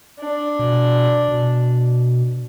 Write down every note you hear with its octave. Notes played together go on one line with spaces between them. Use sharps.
D4
B2
B2